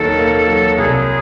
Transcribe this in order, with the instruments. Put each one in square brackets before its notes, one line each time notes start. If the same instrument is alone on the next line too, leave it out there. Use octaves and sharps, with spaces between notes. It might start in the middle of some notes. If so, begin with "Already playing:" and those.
Already playing: [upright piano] D#2 D#3 F#3 A#3 [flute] A4
[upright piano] A#3
F#3
[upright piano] C2 [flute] G#4